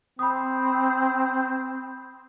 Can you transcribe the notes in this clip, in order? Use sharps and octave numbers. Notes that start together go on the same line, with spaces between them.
C4 B5 D#6